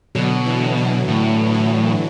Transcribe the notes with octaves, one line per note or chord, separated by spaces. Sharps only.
B2 D3 F#3
E3
D3 F#3
A2 D3
E3